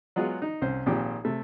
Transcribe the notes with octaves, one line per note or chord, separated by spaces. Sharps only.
F#3 G#3 B3 F4 G#4 D#5
D#4
C2 C4 C#4 C5
G#1 A#2 F3 C4 G4 D6
C3 A3